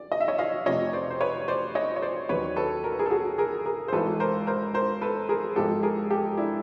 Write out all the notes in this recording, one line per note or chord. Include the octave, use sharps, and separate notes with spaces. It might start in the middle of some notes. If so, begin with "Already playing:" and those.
Already playing: D5
D#5
E5
C#5 D#5
D#5 F5
F1 F2 C3 C#5 D#5
C5 D5
C5
B4 C#5
C5 D5
C#5 D#5
C#5
C5 D5
D#2 D#3 F#3 B4 C#5
A4 B4
A#4
B4
G#4 A#4
A4
F#4 G#4
G#4 A#4
G#4 A#4
C5
G#1 G#2 E3 A4 B4
A#4 C5
A#4 C5
A#4 C5
A4 B4
G#4 A#4
G#1 G#2 F3 G4 A4
G#4 A#4
G4 A4
D4 E4